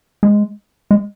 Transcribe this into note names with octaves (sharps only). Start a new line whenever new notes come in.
G#3
G#3